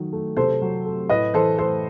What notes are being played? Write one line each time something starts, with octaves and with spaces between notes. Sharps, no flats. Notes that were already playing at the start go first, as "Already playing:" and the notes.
Already playing: D#3 F#3 A3
A3
C3 A4 C5
F#3
A3
A2 B4 D#5
E3 A4 C5
A3 A4 C5